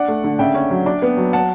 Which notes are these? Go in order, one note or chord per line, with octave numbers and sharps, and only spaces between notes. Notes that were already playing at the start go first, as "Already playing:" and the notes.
Already playing: D4 D5 F#5
A3
D3
C#3 E5 G5
C#4
F#3
D4
B3
F#3
F#5 A5